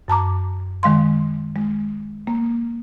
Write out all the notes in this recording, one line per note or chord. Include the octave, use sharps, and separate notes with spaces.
F#2 A5 A#5 D6
D#3 G#3 F5 C6
G#3
A#3